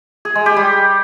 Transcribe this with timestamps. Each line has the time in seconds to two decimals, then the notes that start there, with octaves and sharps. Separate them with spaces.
0.25 G#4
0.35 G#3
0.46 G4
0.56 G3